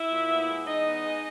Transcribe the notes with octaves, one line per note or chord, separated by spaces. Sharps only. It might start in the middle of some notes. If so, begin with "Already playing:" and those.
Already playing: E4 E5
A#2
B3
G#3
E2 D#4 D#5
B3
G#3